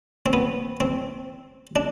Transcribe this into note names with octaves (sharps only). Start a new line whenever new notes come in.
C4
B3
C4
D4